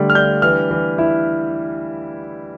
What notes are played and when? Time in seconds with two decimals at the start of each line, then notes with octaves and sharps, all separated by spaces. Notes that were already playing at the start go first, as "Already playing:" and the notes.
Already playing: D3 G3 A3
0.10 F6
0.15 D4 G6
0.42 E3 F6
0.71 E3
0.98 E4